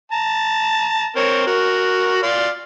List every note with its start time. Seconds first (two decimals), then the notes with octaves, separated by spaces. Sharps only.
0.12 A5 A#5
1.16 C4 A#4 C#5
1.47 F#4 A#4
2.23 D5 F5 C6